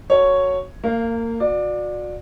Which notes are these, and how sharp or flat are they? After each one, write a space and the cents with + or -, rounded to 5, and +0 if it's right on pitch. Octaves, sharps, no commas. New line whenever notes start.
F#4 +0 A4 +30 C#5 +0
A#3 -25 F5 +0
F#4 -35 D5 +15